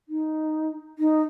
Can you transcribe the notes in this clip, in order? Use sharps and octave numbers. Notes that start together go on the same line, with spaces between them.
D#4
D#4